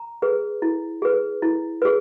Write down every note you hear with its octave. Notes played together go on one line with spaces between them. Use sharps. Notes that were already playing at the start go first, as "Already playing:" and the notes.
Already playing: A#5
G#4 B4
E4
G#4 B4
E4
G#4 B4